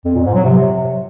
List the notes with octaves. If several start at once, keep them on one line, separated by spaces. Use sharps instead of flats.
F2
A#2
G#2
F#3
C3